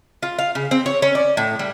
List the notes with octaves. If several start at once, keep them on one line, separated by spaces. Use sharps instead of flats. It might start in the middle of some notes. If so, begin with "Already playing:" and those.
F4
F5
C#3
C4
C#5
C#4
D5
A2
G3